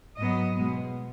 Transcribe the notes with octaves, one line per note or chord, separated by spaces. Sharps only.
G#2 F#3 B3 D#5
B2 G#3 B3